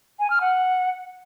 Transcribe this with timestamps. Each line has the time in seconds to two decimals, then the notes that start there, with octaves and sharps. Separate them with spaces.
0.19 G#5
0.30 F6
0.41 F#5